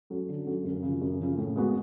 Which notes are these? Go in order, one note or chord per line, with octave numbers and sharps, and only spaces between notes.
F#3 C#4 F#4 A4
D3
F#3 C#4 F#4 A4
F#2
C#3 F3
F#2
C#3 F3
A2
G#3 B3 F#4